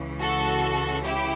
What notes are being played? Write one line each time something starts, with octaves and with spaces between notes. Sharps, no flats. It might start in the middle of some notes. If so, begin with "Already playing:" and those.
Already playing: C#2 C#3 E3
F#4 A4
E4 G4